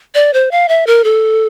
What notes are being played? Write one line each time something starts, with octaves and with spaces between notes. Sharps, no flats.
D5
C5
F5
E5
A#4
A4